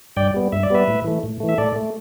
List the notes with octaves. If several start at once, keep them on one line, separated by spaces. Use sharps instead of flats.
G2 D5 G5
G3 B3
G2 E5
D5
G3 B3 B4 E5
A2
E3 A3
A2
E3 A3
E5
A2 A4 D5
A3